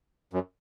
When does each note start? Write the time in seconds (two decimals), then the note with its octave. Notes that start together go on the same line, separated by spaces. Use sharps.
0.33 F#2